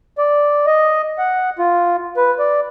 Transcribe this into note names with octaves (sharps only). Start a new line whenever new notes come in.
D5
D#5
F#5
F4
B4
D5